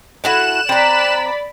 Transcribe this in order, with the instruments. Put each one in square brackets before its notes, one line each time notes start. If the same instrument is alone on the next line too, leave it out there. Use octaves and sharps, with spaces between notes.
[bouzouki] A3 E4 F#4 [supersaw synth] F#6 E7
[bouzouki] C4 A#5 [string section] D5 B5